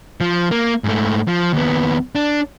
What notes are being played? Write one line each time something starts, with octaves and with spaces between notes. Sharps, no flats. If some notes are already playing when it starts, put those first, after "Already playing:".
F3
A#3
G#2 A3
F3
D#2 B3
D4